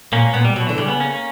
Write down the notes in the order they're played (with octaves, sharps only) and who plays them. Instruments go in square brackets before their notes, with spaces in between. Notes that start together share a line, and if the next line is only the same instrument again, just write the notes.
[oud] A#2 [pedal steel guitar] A#3 C#4
[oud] A#2 [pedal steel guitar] B3
[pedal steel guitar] G3
[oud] B2 [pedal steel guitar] F#3
[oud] D3 [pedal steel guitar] E3
[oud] C#3 [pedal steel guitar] G3
[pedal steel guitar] B3
A#3 C#4
A#3 C#4